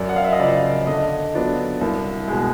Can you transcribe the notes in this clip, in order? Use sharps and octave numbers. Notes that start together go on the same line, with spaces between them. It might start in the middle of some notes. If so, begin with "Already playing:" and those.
Already playing: F#2 D5
F#5
F5
E5
D#5
C#3 F3 D5
D3 D#5
F#3 B3 D4 F4
C2
B2 G#3